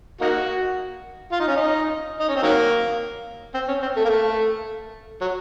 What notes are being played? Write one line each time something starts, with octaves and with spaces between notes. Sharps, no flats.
A#3 D#4 F#4
F4
D#4
C#4
D#4
D#4
C#4
C4
D#3 F#3 A#3
C4
C#4
C4
A3
A#3
A3
F#3